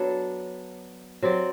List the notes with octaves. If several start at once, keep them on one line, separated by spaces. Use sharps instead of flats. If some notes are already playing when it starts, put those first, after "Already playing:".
Already playing: F#3 B3 D4 A4
F#3 C4 G4 D5